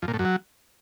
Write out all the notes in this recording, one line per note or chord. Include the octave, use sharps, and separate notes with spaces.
F2
A#2
A2
F#2
F#3